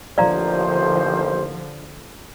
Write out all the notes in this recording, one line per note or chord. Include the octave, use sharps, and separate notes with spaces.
A1 D#2 D3 F3 C5 D5 F5 A#5